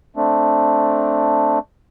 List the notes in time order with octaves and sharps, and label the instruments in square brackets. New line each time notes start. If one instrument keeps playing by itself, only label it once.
[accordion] A3 C4 D4